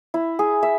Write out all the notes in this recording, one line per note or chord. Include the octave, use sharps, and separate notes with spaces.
E4
G#4
E5